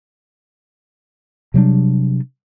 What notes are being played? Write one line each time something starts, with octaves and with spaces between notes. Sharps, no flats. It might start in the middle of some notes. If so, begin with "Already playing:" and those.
C3 F#3 G3 D4